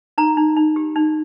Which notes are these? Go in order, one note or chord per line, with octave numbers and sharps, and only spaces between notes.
D#4 A#5
D#4
D#4
G4
D#4